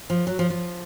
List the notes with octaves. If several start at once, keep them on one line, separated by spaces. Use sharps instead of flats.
F3
F#3
F3
F3